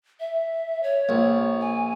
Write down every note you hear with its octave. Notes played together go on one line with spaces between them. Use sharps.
E5
C#5
A#1
G#5